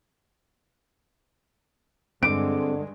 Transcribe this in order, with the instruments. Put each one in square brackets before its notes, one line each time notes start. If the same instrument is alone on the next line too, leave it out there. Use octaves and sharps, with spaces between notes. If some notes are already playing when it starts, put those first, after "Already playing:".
[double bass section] G2 G#3 [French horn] D3 [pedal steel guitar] C4 A4 D6 [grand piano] D7